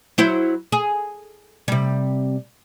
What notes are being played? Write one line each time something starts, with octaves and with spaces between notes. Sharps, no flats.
F#3 E4 C5
G#4
C3 G3